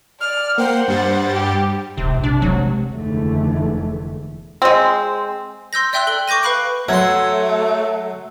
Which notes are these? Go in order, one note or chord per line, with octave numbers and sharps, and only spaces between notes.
D5 F6
A#3 C5 F#5 G5 C7
G2 G3 A6
G4
D#1 G#1 C3
F1 A#1
C3 D4
D#3 F#3 G#3
F1 D#2 D3 E3 G#3 A3
G#3 C4
C6 E6 G6 A#6
D5 E5 G5 C6 E6 F#6
A4 G7
C#6 D6 G6 A#6 D#7
B4 F5 B5 F#6 D7
F#3 A3 E5 F#5 C6 G#6